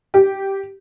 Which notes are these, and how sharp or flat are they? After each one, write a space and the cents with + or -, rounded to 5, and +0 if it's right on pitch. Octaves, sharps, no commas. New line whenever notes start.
G4 -10